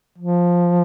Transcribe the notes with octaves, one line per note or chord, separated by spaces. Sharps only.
F3